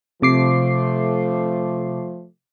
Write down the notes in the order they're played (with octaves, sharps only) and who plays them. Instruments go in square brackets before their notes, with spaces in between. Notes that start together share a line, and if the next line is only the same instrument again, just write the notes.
[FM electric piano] C3 D6 C7 [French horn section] F3 A3